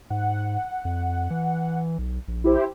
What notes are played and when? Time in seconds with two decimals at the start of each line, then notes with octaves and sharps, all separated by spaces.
0.10 G#2 F#5
0.85 F2
1.30 E3
1.98 B1
2.28 A#1
2.44 E4 G4 C5